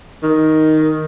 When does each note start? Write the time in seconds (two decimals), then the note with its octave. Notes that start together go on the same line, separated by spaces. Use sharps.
0.23 D#3